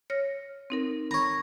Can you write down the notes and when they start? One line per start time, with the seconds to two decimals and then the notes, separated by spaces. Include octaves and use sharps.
0.10 C#5 F6 A#6
0.70 C4 D#4 A#4
1.11 C#5 A#5 B5